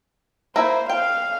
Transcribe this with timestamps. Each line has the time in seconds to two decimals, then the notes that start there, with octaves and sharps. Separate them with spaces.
0.56 A#3 E4 C5
0.89 F5 G5